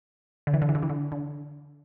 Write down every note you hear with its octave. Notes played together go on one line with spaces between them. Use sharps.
D3
E3
D3
E3
D3
E3
D3
D3